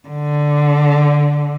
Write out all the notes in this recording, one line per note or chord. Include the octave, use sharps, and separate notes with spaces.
D3